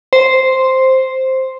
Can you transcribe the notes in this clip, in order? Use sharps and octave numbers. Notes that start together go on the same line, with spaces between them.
C5